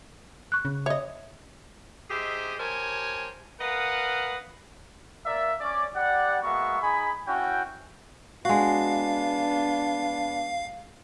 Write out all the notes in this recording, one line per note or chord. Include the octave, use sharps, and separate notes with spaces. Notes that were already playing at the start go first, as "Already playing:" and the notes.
C#6 F#6
C#3
C#5 D#5 E5
D#4 G4 G#4 C5 D#5 E5
G4 A#4 C5 C#5 G#5 A5
A#4 B4 D#5 F5 F#5
A#3 A#4 D5 E5
C#4 D5
G3 G4 D5 F#5
G#3 A#3 B3 F#4 E5 C#6
D#4 G#4 G#5 B5
C#4 E4 F#4 G5
G#3 B3 D4 F#4 F5